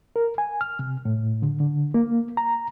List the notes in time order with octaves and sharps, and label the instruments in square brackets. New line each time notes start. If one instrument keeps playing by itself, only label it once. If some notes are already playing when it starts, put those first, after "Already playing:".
[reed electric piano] A#4
G#5
F6
C3
A2
D3
D3
A#3
A#5